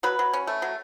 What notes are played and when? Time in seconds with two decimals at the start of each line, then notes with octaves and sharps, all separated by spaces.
0.03 F#3 B4 B5
0.19 F#3
0.33 C#4
0.47 A3
0.62 F#3